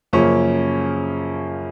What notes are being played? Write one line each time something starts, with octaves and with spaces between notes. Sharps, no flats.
F#2 C#3 F3 A#3 C#4